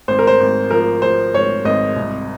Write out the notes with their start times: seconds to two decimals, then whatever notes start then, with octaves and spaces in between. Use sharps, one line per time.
0.08 G#1 C5
0.19 A#4
0.27 C5
0.40 G#1
0.71 F3 A#4
1.02 F3 C5
1.34 G#1 C#5
1.65 G#1 D#5
1.96 C2